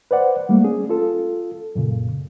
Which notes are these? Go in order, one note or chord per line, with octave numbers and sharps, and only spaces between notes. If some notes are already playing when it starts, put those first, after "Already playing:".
B4 C5 D5 F#5
G3 A3 A#3
C#4 G#4
F4 A4
F#2 A#2 C#3